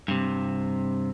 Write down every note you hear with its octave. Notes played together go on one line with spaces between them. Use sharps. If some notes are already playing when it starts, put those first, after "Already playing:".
G2 C3